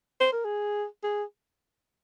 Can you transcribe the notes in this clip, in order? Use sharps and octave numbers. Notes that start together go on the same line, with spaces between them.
C5
A#4
G#4
G#4